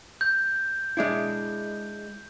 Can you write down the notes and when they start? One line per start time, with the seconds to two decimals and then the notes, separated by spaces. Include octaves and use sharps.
0.21 G6
0.97 G#3 D4 E4